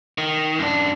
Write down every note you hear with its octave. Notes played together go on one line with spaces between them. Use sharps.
D#3
F#2 D4